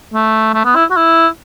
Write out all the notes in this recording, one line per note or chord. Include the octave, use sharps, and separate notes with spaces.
A3
A3
B3
E4
F#4
E4